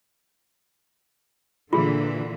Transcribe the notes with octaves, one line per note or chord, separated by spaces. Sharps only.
A#2 D3 E3 F4 G#4